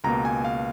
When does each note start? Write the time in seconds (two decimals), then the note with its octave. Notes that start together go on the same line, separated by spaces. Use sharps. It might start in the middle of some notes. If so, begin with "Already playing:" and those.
0.04 C#2 B2 A#3 A#5
0.25 G#5
0.45 F5